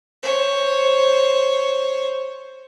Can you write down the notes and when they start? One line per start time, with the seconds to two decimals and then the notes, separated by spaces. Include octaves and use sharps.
0.23 C5 C#5